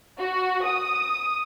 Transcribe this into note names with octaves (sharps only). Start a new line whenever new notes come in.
F#4
D#6